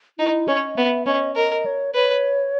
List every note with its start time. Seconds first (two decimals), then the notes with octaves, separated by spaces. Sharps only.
0.19 D#4 E4
0.48 C#4 D#5
0.76 B3 E5
1.06 C#4 D#5
1.36 A#4 D#5
1.66 C#5
1.95 B4 C#5